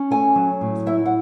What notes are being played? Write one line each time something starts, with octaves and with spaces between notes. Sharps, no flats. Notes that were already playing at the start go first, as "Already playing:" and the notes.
Already playing: C#4
A3 G#5
F#3
A2
E4 E5
F#5